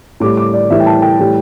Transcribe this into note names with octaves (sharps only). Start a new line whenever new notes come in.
A2 G3 D6
D6
D5
A2 E3 G3 E5
G5
A5
G5
A2 E3 G3